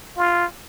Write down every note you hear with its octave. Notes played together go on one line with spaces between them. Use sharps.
F4